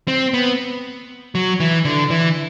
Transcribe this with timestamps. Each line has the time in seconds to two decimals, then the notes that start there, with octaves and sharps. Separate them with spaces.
0.08 C4
0.34 B3
1.35 F#3
1.60 E3
1.85 D3
2.10 E3